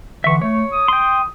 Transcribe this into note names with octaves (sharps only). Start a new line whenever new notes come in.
D3 E3 E5 C#6
A3 C#5
D#6
G5 C6